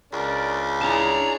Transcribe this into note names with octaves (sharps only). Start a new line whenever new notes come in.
C#2 D4 A#4
D4 E4 G#4 C#5 A5 A#5